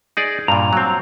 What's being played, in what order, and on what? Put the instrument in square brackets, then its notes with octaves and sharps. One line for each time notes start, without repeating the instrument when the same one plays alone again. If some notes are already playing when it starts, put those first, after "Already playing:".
[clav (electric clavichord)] D#4 G#4 D5
[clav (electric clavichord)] G2 A#2 [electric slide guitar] A#5
[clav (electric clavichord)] F#3 C4